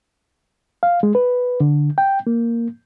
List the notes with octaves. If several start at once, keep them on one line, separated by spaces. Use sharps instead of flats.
F5
G#3
B4
D3
G5
A#3